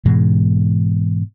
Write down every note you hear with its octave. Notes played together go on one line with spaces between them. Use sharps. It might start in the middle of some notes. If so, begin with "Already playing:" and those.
G#2 B2 E3 G#3